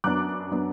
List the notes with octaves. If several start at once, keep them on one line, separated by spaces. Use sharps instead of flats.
F#2 F#3 B3 D4 D6 F#6
F#3 B3 D4